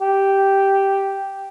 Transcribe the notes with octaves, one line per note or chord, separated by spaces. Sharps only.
G4